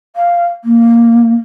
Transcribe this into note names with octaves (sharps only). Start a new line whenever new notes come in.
F5
A#3